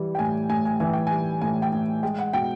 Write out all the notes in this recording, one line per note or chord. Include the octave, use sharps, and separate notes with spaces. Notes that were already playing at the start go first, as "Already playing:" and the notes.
Already playing: E3 G3
G5
A2 G#5
A2 G#5
G#5
E3 G#5
G5
G3 G#5
A2 G#5
G5
A2
G#3 G5
F#5
B2 G5